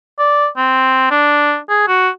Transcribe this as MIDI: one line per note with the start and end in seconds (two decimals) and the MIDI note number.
0.19 0.47 74
0.57 1.06 60
1.11 1.58 62
1.69 1.83 68
1.88 2.09 66